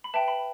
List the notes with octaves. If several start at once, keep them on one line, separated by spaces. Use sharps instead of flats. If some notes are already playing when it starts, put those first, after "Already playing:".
B5
B4 E5 G5 A5
B5